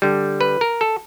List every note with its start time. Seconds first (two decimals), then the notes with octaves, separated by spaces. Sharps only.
0.02 D3 G3
0.41 B4
0.61 A#4
0.81 A4